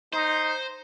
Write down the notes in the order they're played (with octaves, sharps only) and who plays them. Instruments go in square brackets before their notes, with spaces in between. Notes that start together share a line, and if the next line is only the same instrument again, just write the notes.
[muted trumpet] D#4 [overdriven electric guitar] C5